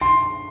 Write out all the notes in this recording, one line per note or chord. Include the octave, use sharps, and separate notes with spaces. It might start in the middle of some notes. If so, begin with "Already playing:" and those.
C6